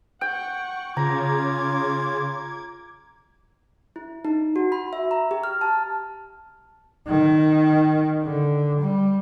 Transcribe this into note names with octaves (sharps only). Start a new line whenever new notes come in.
F#5 G5 C#6
C#3 F4 A#5 D6 G#6
E4
D#4
F#4
B5
E5
A#5
G4
F6
A5
D#3
D3
G3